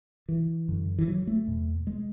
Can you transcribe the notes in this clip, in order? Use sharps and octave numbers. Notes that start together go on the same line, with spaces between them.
E3
F#2 D3
E3
F#3
A3
E2 B2
G#3